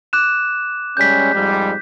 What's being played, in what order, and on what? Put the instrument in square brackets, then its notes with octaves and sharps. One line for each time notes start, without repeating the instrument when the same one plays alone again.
[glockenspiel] D6 F#6 E7
[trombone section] G3 G#3 C#4 [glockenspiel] G6 B6
[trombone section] F2 G#2 G3